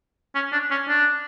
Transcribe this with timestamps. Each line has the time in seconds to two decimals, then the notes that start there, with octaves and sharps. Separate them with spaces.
0.35 C#4
0.52 D4
0.71 C#4
0.89 D4